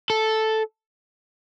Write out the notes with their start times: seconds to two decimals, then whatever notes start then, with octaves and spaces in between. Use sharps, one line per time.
0.10 A4